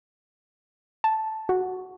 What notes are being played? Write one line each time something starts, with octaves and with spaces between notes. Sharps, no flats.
A5
F#4